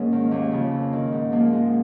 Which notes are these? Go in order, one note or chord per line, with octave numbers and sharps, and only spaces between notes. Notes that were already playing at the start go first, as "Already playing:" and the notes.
Already playing: G#2 A#3 C#4
D#3
D#2 A#3
C#3 F3
F2
D#3
G#2
F3 A#3
G#2 G#3